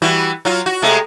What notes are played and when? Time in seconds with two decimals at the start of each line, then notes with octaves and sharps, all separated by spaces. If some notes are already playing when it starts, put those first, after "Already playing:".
0.02 E3 G3 F#4
0.45 F#3 F4
0.66 F#4
0.82 C3 G#3 A3